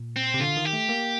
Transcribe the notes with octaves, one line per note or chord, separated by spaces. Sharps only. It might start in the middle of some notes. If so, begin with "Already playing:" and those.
Already playing: A#2
C4
C3
D3 F4
D#3
G4
A3
A#3